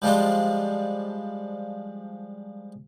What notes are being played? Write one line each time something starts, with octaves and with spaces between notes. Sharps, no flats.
F3 G3 G#3 D4 F4